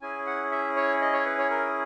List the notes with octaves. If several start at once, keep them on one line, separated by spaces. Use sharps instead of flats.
C#4 E4 G#4 G#5
F#5
E5
C#5
D#5
C#5
B4
C#5
A#4